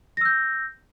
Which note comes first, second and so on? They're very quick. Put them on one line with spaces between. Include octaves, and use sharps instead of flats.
A#6 E6 G6